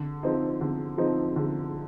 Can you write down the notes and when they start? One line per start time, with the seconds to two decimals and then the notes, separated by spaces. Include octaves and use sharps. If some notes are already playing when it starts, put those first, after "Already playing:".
Already playing: D3
0.23 F3 C4 D#4
0.61 D3
0.98 F3 C4 D#4
1.36 D3